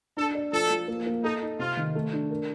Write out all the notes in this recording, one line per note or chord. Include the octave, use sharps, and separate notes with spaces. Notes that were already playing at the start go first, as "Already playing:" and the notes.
D4 A4
D5
F3 A4
F3
A#3
A#3
D#4 A4
D#4
C3 F4
D#3
A3
D4
A#4